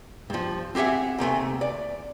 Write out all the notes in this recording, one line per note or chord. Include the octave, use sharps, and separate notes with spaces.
G2 F3
C4 G4 G#4 E5 F#5
D#2 C3 A3 G#5
D5